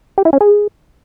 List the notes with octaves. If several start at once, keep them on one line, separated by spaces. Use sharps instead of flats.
G4
E4
C#4
G#4